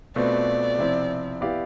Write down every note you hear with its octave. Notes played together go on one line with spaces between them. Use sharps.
B2 A3 C4 F4 B4 D5
C3 F3 C4 E4
B3 E4 G4 D5 F5